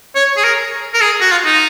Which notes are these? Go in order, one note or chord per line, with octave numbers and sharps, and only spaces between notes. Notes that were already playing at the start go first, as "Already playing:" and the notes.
C#5
G#4
A#4
A#4
G#4
F#4
F4
D#4